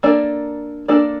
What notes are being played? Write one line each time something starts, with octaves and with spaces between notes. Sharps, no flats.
A#3 D4 A4 D5
A#3 D4 A4 D5